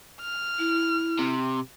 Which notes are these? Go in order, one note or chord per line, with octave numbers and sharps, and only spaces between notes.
F6
E4
C3